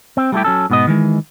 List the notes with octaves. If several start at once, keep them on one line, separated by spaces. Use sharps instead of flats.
C4
G3 A3 E4 G4
F#3 C#4 A4
G#2 B2 B3 F#4 D#5
D#3 E3 G#3